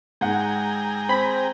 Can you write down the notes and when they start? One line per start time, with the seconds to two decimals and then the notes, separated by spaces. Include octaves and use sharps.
0.21 G#2 G#4 F#5 G5 A#5
1.09 C4 B5